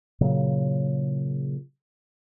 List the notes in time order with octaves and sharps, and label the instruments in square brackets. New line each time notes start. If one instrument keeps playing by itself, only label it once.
[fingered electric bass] A#2 C#3 F#3